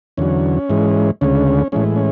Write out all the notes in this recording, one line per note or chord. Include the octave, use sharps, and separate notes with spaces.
E2 D3 F#3 C#4
G#2 E3 G#3
D2 C#3 G#3 C#4
A2 E3 G#3 C#4
C#4